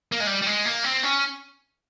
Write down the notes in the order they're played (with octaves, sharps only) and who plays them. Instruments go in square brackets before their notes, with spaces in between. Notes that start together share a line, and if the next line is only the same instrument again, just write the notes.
[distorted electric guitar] A#3
G#3
G3
G3
G#3
A#3
C4
C#4